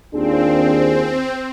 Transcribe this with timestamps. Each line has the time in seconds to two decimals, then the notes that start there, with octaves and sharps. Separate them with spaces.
0.14 D#2 C4 D4 F4 G#4